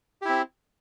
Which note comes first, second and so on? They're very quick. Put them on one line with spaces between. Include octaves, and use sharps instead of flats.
G4 E4 C4